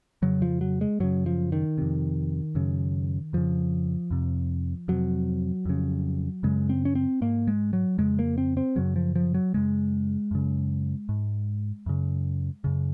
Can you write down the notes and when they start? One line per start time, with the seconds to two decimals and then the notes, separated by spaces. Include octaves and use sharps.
0.22 F2 C#3 F#3
0.42 F3
0.61 F#3
0.81 G#3
1.00 F#2 C#3 F#3
1.26 F3
1.52 D#3
1.78 F2 C3
2.55 F#2 C#3
3.33 F2 C#3 F3
4.11 F2 C3
4.88 F2 C3 F#3
5.65 F2 C#3
6.43 F#2 C#3 G#3
6.69 C4
6.85 C#4
6.95 C4
7.21 G#2 A#3
7.47 G#3
7.73 F#3
7.98 F2 C#3 G#3
8.19 A#3
8.38 C4
8.57 C4
8.76 F#2 C#3 F#3
8.96 F3
9.15 F3
9.34 F#3
9.54 F#2 C#3 G#3
10.31 F#2 C#3
11.09 G#2
11.86 F#2 C#3
12.64 F#2 C#3